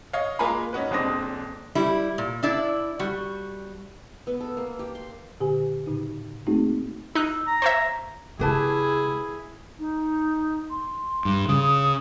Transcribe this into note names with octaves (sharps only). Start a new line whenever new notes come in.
C#5 D#5 F5
G#3 A#3 F4 G#5 A#5 B5
C#4 D#4 F#4 B4
D#1 G#3 C4 D4 D#6 A#6
G3 E4
A#2
D4 E4 D5
G3 F#4
B3
A4
A#3
G4
C6
A#2 D3 G4 G#5
A2 C#3 D#4
A3 A#3 C4 D#4 F#4 G#4
D#4 E6 F#6
A#5
C5 C#5 E5
C#3 G#3 E4 G4 G#4 B4 A5
D#4
C6
G2
C#3 D#6